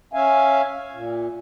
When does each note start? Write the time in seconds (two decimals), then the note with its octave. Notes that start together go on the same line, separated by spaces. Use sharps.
0.13 C#4 E5 F5 G#5
0.92 A#2